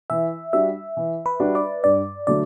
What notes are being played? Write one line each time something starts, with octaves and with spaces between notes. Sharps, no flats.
E3 E5
G3 D4 F#4 E5
E3
B4
G3 D4 F#4
D5
G2 D5
D3 F#3 A3 D5